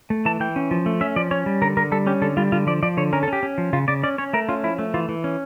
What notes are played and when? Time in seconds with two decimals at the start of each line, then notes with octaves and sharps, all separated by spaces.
0.10 A3
0.25 E3 A5
0.40 E3 G5
0.56 C#4
0.71 F3
0.86 A3
1.01 C#4 E5
1.16 F3 D5
1.31 C#4 C#5
1.46 G3
1.62 D3 A#4
1.77 D3 A#4
1.92 G3 A4
2.07 C#4 G4
2.22 D3 A4
2.37 G3 F4
2.52 D3 F4
2.67 F3 D5
2.83 F3 D5
2.97 D3 C#5
3.13 C#4 A#4
3.23 A4
3.28 C#4
3.33 G4
3.43 C#4
3.58 F3
3.73 C#3 F4
3.88 C#3 D5
4.03 C#4 D5
4.18 C#4 C#5
4.33 A3 A#4
4.49 C#4 F4
4.63 F3 E4
4.79 A3
4.94 E3 F4
5.09 E3
5.24 C#4